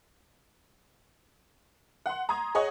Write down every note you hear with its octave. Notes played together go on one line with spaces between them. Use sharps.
F#5 C6
A#5 C6 D#6 G#6
G#4 C#5 D#5 F#5